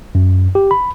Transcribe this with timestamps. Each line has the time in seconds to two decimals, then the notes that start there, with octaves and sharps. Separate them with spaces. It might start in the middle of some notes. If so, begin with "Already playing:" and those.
0.15 F#2
0.55 G4
0.71 B5